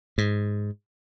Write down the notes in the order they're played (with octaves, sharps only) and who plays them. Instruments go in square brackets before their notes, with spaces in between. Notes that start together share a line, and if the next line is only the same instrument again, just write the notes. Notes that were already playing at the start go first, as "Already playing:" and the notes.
[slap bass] G#2